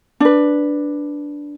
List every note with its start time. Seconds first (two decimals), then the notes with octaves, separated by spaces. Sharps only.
0.20 D4 B4